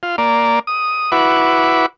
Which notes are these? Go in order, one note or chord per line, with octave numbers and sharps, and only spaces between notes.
F4
A#3 D5
D#6
E4 F#4 B4 D6